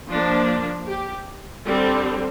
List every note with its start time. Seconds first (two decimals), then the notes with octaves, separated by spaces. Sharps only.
0.10 F3 A#3 D4
0.88 G4
1.66 D3 G3 C4